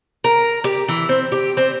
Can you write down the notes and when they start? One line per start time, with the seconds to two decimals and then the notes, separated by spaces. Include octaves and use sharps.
0.24 A#4
0.64 G4
0.88 E3
1.09 C4
1.32 G4
1.57 C4